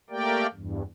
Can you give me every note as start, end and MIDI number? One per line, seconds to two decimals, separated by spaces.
0.10 0.47 57
0.10 0.47 58
0.10 0.47 67
0.10 0.47 70
0.10 0.47 74
0.10 0.47 79
0.54 0.83 40
0.54 0.83 43